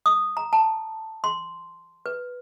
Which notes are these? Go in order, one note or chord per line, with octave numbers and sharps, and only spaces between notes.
D#6
A#5
A5
C6
B4